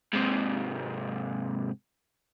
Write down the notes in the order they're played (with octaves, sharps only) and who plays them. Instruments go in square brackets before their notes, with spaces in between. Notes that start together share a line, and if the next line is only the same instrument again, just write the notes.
[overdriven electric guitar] G#2 C3